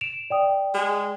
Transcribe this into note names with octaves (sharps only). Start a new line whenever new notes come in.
D7 E7 F7
D5 G5 D#6
G#3